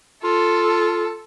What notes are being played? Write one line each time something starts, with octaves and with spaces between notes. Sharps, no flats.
F4 A4